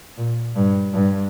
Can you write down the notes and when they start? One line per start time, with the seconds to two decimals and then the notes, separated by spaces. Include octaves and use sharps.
0.17 A#2
0.56 G2
0.94 G2